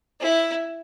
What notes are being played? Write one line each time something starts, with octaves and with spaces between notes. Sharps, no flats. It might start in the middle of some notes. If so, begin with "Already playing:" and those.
E4